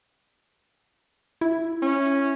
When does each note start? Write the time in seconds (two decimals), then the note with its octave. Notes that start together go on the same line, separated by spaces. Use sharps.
1.41 E4
1.82 C#4